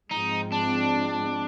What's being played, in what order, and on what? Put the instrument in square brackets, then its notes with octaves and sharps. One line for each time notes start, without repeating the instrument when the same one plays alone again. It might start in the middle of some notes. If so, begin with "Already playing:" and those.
[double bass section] G#2 F3 G#3 C4 [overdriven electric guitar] D#4
[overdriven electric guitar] D4